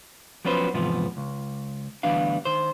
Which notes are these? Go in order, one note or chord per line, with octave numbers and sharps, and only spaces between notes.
F3 F#3 B3 C#4 B4 C5
E2 G#2 C3 F3 B3
C#2
D2 E3 G3 B3 D4 F5
D#3 C5